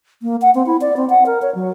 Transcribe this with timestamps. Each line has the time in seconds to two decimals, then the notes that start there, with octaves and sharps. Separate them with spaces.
0.22 A#3
0.42 F#5
0.55 C4
0.66 E4
0.81 D5
0.97 C4
1.10 F#5
1.26 A#4
1.42 C#5
1.55 F#3